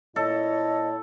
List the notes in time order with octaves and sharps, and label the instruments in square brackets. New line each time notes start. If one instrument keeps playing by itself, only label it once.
[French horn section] A#2 E4 [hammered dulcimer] A4 [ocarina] C#5 [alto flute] D#5